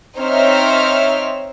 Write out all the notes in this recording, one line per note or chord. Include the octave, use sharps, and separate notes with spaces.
C4 D#4 C5 C#5 E5 F6